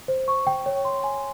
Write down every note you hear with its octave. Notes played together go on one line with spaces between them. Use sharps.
C5
C#6
G5
C#5
C6
G#5